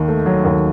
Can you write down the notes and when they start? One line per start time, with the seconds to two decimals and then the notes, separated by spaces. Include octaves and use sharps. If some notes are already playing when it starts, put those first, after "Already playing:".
Already playing: D#2 D#3
0.08 A3
0.26 F#3
0.45 D#2